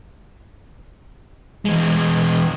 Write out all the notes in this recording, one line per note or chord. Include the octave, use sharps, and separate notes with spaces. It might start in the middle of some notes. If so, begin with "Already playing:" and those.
E3 G#3